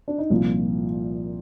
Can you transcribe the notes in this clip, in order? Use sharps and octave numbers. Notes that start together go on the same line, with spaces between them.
D4
D#4
C2 A#2 F3 F4